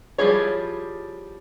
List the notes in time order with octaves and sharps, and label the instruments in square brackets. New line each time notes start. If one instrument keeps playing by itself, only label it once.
[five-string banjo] F3 G3 E4 G#4 C#5